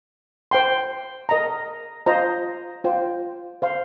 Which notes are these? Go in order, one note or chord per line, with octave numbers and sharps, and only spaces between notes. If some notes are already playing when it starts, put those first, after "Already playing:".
C5 G5 C6
A#4 D#5 A#5
F4 C5 D#5 A#5
F4 C5 G5
C5 F5 C6